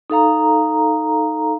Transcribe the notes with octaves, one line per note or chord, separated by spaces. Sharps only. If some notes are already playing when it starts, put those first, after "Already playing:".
D#4 A4 F5 A#5